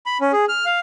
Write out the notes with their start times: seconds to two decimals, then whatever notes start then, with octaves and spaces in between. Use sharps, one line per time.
0.06 B5
0.21 C#4
0.32 G#4
0.49 F6
0.65 F5